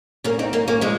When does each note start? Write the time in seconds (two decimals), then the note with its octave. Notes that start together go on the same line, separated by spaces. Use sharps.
0.24 A#3 C#4
0.39 C4 D#4
0.53 A#3 C#4
0.68 A#3 C#4
0.81 F3 G#3